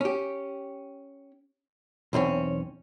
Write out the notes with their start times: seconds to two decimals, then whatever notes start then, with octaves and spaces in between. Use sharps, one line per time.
0.01 C#4 G4
2.13 B1 E2 C4 C#4